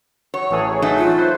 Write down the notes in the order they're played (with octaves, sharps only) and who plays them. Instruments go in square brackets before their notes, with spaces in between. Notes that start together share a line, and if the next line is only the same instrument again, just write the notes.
[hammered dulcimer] F#3 [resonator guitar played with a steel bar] C#5
[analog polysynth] A1 E3 G#4 [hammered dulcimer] A2 A4
[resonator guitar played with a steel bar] F#3 A3 D#4
[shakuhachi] F4
[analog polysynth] B4 C5